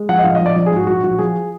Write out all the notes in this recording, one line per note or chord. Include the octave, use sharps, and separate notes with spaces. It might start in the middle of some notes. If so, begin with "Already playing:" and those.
Already playing: G#3
F3 F#5
D#5
A#1 F5
D#5
A#1
D5
F3
G#4
G#2
F#4
A#1 F#4
A#1 F#4
F3 G#4